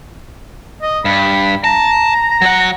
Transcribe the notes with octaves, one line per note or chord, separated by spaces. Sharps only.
D#5
G2 B5
A5 A#5
F#3 F#5